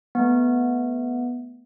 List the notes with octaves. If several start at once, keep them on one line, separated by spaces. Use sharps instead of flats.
A3 B3